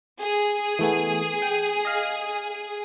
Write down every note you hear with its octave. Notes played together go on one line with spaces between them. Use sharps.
G#4
E3 A3 B3
G5
D#5 F5